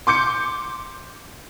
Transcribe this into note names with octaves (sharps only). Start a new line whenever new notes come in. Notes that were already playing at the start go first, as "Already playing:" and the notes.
C6 D6 G6 C#7